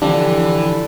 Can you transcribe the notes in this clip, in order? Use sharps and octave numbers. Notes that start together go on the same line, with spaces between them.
D3 E3 F3 D4 G4